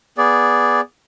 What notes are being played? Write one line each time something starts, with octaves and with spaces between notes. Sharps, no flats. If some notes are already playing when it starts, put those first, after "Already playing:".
B3 G#4 D5